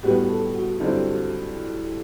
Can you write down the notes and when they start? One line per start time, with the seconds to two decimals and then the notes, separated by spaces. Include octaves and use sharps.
0.03 A2 G3 B3 F#4 G4 B4
0.29 A4
0.55 F#4
0.80 G2 D3 F#3 C4 E4